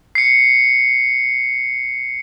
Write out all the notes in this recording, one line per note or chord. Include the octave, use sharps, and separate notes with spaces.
C7 C#7